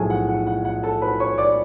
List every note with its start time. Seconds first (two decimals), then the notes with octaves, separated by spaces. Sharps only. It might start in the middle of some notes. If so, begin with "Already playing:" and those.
Already playing: B1 A2 F3 G#4 A4 G#5 A5
0.10 F#5
0.29 F#5
0.47 F#5
0.65 F#5
0.83 A4 A5
1.02 B4 B5
1.20 C#5 C#6
1.38 D5 D6